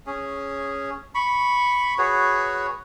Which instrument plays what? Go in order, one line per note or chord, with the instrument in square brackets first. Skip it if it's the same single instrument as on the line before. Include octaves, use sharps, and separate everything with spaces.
[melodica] C#4 G#4
B5 C#6
F#4 G#4 B4 C#5